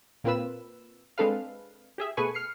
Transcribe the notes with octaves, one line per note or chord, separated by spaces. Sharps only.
A#2 A#3 C4 F4 B4 E6
G#3 C4 D4 A4 B4 F5
G4 G#4 E5
B2 A3 G#4 B4 G#5 C#6
F6 C7 C#7